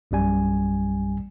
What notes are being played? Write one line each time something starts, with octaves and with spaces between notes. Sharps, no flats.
A#1 F#2 G3 G#5